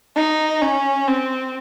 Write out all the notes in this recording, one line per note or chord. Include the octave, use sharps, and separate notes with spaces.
D#4
C#4
C4